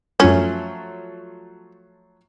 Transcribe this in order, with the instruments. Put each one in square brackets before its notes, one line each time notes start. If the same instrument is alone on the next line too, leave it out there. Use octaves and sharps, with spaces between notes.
[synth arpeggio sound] F#2 D4 [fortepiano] F3 F#3 A3 [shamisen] C#4